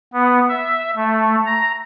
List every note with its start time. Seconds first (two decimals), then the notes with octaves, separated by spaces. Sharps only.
0.14 B3
0.49 E5
0.96 A3
1.46 A#5